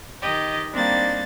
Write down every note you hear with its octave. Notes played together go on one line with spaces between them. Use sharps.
D#3 G4 D#5
G3 A#3 C4 D4 D#4 A6